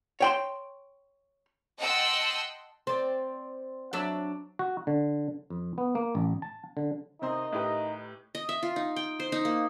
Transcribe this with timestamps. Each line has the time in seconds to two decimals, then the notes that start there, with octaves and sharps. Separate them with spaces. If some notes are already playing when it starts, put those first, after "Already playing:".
0.20 C#5 G5 C6
1.78 D#5 F#5 G5 A5 C6 E6
2.87 C4 D5
3.93 F#3 D4 E5
4.59 F#4
4.87 D3
5.50 F2
5.78 B3
5.95 A#3
6.15 A1
6.42 A5
6.77 D3
7.22 C3 D#3 C4 D#4 D#5 C6
7.53 A2 G4 B4
8.35 D#5
8.49 E5
8.63 F4
8.76 D#4
8.96 G5
9.20 C5
9.32 D#4
9.45 A#3